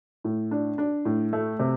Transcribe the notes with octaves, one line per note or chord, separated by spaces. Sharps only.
A2
D4
D4
A2
A3
C3